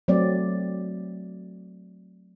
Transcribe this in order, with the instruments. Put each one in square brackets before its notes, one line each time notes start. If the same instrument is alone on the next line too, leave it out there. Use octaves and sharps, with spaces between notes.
[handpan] F#3 A3 C4 D5